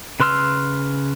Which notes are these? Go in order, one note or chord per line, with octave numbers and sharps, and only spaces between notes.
C#3 B4 C6 E6 F6